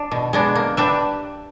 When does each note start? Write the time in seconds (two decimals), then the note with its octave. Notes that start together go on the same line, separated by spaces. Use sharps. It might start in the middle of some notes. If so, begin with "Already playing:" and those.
Already playing: D4
0.12 B2
0.33 G#3 B3 D4
0.56 A#3
0.77 D4 G4 B4 E5